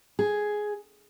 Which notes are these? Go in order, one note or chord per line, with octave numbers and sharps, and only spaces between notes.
G#4